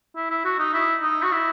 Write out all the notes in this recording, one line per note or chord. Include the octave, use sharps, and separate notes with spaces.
E4
E4
F#4
D#4
E4
D#4
F#4
E4